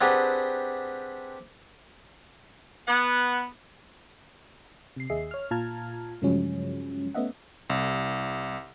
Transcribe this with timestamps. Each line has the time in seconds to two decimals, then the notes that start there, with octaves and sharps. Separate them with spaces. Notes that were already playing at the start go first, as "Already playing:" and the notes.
0.01 C4 D4 G4 G#4 B4 F#5
2.87 B3 F#5
4.96 C3 C7
5.10 D#2 G#4 D#5 E5 C7
5.31 C#5 F6
5.51 A#2 F4 A5 A#5 F6 G#6
6.22 G2 C#3 F3 F#3 G#3 C#4
7.14 A3 B3 C#4 D#5 E5 F#5
7.70 C2